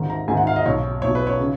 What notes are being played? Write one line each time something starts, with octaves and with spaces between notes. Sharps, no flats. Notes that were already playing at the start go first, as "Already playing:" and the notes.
Already playing: G#1 G#2 D#3
A#5
G#1 G#2 D#3 G#5
F#5
F5
D#5
B1 B2 C#5
B1 B2 C#5
B4
C#5
C#3